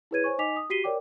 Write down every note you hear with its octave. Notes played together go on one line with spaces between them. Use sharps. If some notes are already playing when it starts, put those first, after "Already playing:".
E4 G#4 B4 C#5 G#6 D#7
C5 C#5 G#5 C#6
D#4 D#5 G#5 D6 B6 F7
D#6
F#4 G4 B6 C7 D#7 G7
A#4 C#5 D5 G5 D6